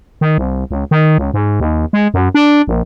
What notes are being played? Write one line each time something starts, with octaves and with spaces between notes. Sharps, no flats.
D#3
C2
C#2
D#3
C#2
G#2
D#2
G#3
F#2
D4
A#1